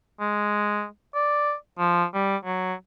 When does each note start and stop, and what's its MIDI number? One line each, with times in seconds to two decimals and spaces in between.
0.20 0.86 56
1.15 1.54 74
1.79 2.04 53
2.14 2.36 55
2.45 2.74 54